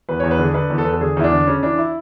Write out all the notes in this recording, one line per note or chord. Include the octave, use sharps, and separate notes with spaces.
E2 B4
E2 C#5
B4
D3 G#4
D3 B4
E2
A4
E2 B4
A4
D3 G#4
E2 E4
D4
D3
C#3 C#4
E3 D4
E4